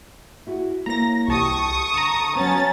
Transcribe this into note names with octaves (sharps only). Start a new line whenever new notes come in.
E4 F#4 G#4
A#3 E4 C#5 A#5 A#6
C2 E3 G4 A5 C#6 D#6
D3 A5 A#5
F#3 B3 C#4 A6